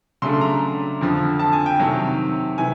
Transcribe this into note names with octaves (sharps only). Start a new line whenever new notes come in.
C#3 F#3 A3 D4 C6
A#5
F2 D3 F3
A5
G#5
G5
C3 D#3 F#3
C3 E3 G#5